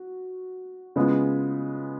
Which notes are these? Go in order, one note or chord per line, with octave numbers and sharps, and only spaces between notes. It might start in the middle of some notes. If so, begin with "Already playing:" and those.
Already playing: F#4
C#3 G#3 B3 F4